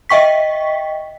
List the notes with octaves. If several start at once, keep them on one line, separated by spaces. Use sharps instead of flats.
D#5 E5 G5 C#6 B6